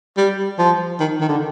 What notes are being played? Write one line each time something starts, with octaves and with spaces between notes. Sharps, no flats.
G3
F3
D#3
D#3
D3